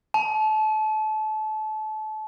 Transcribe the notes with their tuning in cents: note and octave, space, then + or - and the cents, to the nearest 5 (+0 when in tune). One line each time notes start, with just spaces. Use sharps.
A5 -30